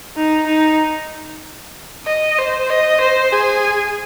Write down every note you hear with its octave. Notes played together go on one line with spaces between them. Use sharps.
D#4
D#4
D#5
C5
D#5
C5
G#4